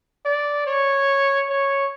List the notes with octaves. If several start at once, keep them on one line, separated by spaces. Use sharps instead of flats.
D5
C#5
C#5